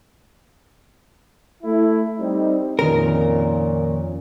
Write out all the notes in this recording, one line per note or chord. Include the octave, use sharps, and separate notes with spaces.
A3 E4
G3 C4 D#4
F2 A#2 D#3 C4 C#4 A#4